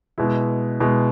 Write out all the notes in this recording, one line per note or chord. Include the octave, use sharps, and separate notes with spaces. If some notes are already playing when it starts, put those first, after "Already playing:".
B2 G#3 E4
B2 G#3 E4